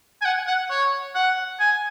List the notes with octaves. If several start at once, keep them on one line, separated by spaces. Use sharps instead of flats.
G#5
F#5
F#5
C#5
F#5
G#5